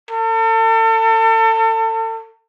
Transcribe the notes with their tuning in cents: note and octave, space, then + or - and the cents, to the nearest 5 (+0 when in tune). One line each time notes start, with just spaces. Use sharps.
A4 +35